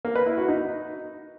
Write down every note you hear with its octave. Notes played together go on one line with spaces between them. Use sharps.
A#3
B4
E4
F#4
D#4